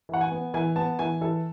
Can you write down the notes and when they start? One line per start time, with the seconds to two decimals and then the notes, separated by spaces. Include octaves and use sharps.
0.09 E3 F#5
0.21 G#5
0.31 B3
0.54 E3 G#5
0.76 B3 A5
0.99 E3 G#5
1.21 E3 A4